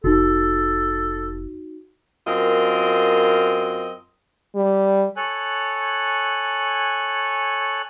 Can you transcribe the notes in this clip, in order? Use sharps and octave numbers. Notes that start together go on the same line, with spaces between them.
F1 D#4 F#4 A4
F#2 C4 F4 A#4 D#5
G3
A4 C#5 G#5 F#6